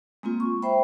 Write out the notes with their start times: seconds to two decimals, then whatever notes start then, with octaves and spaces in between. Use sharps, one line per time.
0.23 G#3 A#3 C4 F4
0.40 C#6
0.62 C5 E5 G5 B5